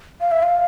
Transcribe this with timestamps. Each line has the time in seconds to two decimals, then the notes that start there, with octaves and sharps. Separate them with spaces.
0.21 F5
0.31 E5
0.43 F5